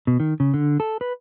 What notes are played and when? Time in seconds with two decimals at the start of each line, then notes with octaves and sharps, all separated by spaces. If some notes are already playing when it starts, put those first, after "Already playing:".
0.07 B2
0.20 D#3
0.40 C#3
0.54 D3
0.80 A4
1.01 B4